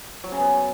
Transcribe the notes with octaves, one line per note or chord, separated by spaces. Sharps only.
F#3
C#3
B3